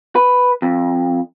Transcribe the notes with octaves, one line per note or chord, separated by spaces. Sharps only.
B4
F2